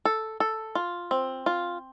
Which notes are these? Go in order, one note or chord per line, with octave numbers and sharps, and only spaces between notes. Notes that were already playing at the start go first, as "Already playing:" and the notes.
A4
A4
F4
C4
F4